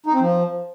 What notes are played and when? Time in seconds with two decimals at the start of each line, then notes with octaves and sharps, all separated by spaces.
0.06 D#4
0.13 C4
0.21 F3